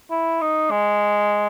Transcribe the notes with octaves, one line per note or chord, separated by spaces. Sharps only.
E4
D#4
G#3